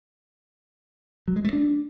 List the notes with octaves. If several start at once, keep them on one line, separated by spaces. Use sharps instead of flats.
F#3
G#3
A3
D4